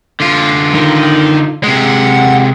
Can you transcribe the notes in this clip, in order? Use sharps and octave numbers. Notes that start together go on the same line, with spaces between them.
D3 F4
D#3
C3 G#3 F#5